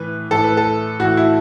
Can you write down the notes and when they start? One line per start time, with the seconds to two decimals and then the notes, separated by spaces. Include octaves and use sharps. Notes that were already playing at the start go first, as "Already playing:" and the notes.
Already playing: A2 E3 B4
0.31 A2 E3 A4
0.44 B4
0.57 A4
1.00 A2 E3 F#4
1.17 E4